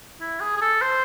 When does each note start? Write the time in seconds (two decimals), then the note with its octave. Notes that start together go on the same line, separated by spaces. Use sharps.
0.21 E4
0.41 G#4
0.57 G#4
0.61 A4
0.82 C5